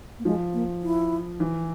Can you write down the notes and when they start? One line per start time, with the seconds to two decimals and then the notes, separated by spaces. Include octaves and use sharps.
0.19 A#3
0.25 F3 G#3
0.54 A#3
0.83 E4
1.40 E3